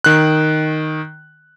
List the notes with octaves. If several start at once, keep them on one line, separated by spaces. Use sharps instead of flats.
D#3 F#6